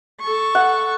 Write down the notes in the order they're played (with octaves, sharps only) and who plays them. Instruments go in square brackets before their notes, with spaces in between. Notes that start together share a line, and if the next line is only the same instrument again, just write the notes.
[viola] A4 C#6
[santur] F#5